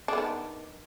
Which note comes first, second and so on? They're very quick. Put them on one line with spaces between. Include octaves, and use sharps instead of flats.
D4 B3 D#3